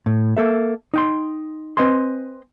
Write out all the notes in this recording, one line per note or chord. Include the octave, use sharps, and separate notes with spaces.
A2
A#3 A4 E5
D#4 G5 C6
C4 B4 D#5 G#5 C6